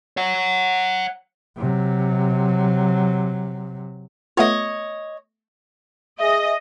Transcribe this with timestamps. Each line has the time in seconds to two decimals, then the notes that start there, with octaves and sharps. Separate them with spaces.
0.17 C#5 F#5
1.58 C3 F#3
4.37 A3 B3 F4 C#5 D#5
6.19 G#4 D#5 E5